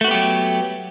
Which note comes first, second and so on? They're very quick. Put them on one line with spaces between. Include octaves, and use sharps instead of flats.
A3 F#4 B3 G4 F#3